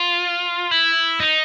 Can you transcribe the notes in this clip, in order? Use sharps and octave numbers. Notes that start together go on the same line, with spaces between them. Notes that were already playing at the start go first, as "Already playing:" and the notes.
Already playing: F4
E4
D#4